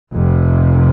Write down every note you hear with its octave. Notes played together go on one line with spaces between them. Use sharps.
F1 F2 C3